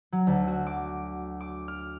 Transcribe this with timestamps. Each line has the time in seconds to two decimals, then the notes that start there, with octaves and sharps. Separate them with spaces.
0.12 F#3
0.27 D2
0.48 F#4
0.67 D6
1.40 D6
1.68 F6